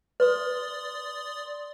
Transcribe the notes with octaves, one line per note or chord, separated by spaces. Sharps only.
B4 D5 C6 D#6